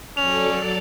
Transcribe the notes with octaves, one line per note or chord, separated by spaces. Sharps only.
F#3 C#4 A4 D5 F7